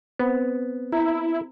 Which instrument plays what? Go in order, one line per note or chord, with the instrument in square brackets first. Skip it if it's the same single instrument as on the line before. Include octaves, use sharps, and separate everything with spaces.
[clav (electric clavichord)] B3 [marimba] C4 C5
[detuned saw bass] E4 [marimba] A#5